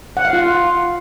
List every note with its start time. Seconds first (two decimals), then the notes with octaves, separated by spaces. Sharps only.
0.17 F#5
0.25 F5
0.33 F4